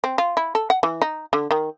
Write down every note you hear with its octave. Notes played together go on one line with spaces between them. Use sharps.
C4
F4
E4
A4
F#5
E3
D#4
D3
D#3